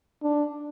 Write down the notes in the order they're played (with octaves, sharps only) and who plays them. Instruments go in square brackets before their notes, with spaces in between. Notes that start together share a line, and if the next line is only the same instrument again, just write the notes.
[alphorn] D4